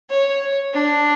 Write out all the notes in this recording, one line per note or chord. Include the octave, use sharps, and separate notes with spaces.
C#5
D4